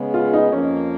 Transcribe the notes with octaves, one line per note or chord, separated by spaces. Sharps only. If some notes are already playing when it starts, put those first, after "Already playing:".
Already playing: C#3 G#3 B3
F4
D#4
F2 F3 A#3 C#4